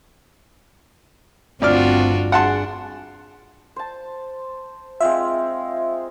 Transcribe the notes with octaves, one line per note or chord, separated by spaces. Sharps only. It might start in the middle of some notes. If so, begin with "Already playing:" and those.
G1 D2 C4 D4 F4 F#4 D5 F6
D4 G#4 F#5 A5 C6
C5 A5
G#3 C4 F4 E5